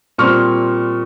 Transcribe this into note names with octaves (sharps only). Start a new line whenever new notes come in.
A#2 G3 C4 C#6 F6